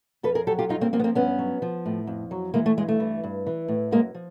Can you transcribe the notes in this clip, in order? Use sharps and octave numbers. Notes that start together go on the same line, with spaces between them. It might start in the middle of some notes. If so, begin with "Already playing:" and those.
F2 A4 B4
G#4 A#4
F#3 G4 A4
F4 G4
G2 D#4 F4
A#3 C4
F3 A#3 C4
B3
A#3 C4
G2 B3 C#4
F#3
F3
A2
F2
F#3
E3 G#3 A#3
A3
G2 G#3
A3
E3
G2
E3
A2
F#2 G#3 A#3
F3